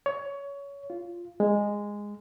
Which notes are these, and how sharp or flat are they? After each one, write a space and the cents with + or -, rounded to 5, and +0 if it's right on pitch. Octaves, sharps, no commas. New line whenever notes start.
C#5 +20
F4 -5
G#3 -10